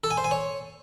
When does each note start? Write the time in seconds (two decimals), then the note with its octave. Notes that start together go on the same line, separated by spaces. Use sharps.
0.04 A4
0.11 G#5
0.17 C5
0.24 G#5
0.31 C#5